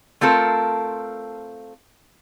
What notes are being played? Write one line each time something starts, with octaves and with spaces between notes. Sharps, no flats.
A3 C4 F4 A4 A#4